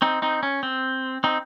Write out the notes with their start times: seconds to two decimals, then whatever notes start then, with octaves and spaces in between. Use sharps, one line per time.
0.02 C4 D#4
0.22 C4 D#4
0.43 C#4
0.63 C4
1.24 C4 D#4